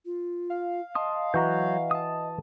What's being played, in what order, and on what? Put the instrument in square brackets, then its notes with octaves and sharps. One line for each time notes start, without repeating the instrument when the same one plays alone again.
[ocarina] F4
[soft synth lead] F5
[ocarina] D#5 [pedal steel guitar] A5 C6 D#6
[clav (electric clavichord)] E3 F#4 A#5 [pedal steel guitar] F#3 G6
[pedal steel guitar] A5 D#6